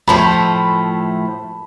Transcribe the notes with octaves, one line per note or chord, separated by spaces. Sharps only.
A2 F3 A3 A5 B5